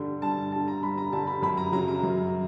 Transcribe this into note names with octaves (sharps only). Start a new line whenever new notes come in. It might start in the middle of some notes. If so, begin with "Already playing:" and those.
Already playing: G2 D3 G3
G2 A5
D3 G3 A5
A#5
G2 B5
A#5
D3 G3 A5
B5
F#2 B5
A#5
C#3 F#3 A#5
A#5
F#2